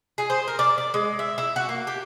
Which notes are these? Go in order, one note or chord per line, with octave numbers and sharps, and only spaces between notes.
G#4
C5
A#4
D5
D5
G#3
E5
E4
F#4
A#3
G4